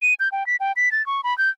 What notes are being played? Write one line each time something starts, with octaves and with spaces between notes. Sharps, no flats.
D#7
G6
G5
B6
G5
B6
A6
C#6
B5
G6